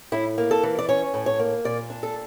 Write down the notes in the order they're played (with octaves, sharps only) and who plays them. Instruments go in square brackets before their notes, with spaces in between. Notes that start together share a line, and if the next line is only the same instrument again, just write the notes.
[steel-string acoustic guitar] A2 E4
A#3
A4
E3
D5
C#4 C#5
A2
C#5
A#3
A#2 D5
D4
A4